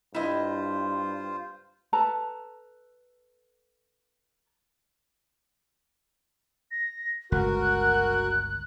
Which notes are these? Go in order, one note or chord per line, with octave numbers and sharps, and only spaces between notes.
G2 E4 F4 C5 D#5
A4 B4 A5 A#5
A#6
G1 C#2 F#4 A#4 F#6